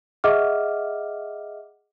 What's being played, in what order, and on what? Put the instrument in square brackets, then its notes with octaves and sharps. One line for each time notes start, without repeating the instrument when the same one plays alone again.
[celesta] G#4 D#5 E5 F#5 D6 F6